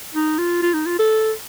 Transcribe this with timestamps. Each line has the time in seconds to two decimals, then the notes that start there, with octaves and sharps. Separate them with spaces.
0.14 D#4
0.38 F4
0.62 F4
0.74 D#4
0.86 F4
0.99 A4